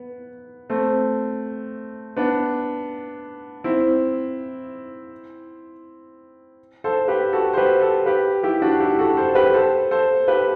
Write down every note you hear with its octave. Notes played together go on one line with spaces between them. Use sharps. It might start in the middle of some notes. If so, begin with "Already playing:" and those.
Already playing: B3
A3 C4
B3 D4
C4 E4
A4 C5
G4 B4
F#4 A4
C5
G4 B4
A4 C5
G4 B4
E4 G4
D4 F#4
E4 G4
F#4 A4
A4 C5
G4 B4
A4 C5
A4 C5
G4 B4